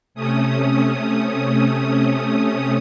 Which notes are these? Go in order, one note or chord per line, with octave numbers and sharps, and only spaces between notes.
C3 A3 C#4 D#6